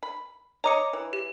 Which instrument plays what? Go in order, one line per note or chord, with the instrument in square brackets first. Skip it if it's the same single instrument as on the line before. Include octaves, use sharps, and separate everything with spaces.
[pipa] B5
[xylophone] C#5 D6 C#7 [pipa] D#5 A#5
[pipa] E3
[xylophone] G4